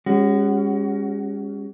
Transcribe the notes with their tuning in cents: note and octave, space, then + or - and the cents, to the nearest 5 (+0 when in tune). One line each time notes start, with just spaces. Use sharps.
G#3 -35 C#4 +0 F#4 +20